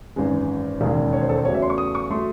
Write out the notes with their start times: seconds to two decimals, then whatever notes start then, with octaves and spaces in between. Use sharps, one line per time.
0.16 G#1 F#2 E3 G#3
0.81 E1 D#2 C#3 G#3
1.13 C#5
1.21 C5
1.29 A4
1.37 C5
1.45 E2 C#3 F#3 A3 C#5
1.54 E5
1.62 C6
1.70 C#6
1.78 D#6
1.95 C#6
2.10 F#3 A3 C6